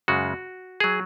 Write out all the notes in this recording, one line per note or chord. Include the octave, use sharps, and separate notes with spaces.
F#2 C#3 G#3 F#4
F#3 G#4